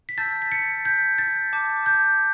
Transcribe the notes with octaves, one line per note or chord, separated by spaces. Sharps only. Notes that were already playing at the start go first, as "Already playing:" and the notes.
B6
A5 E6 G6 A6
B6
A6 C#7
G6 B6
A6
A5 D6 G6
G6